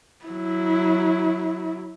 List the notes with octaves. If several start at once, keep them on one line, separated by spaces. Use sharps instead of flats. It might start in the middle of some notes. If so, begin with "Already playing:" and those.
F#3 E4